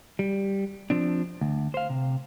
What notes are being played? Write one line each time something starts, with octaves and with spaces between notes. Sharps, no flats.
G3
F3 C4 D4
D2
C5 F5
C3